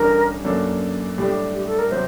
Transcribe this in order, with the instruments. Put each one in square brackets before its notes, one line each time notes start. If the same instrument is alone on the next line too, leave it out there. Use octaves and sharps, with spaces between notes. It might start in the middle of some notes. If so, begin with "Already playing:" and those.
Already playing: [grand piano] A1 G2 D3 G3 D4 [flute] A#4
[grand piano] F#2 F#3 A#3 D4 A4
[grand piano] A2 G3 D4 [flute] G4
[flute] G4
A4
A#4
[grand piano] C3 F#3 [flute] C5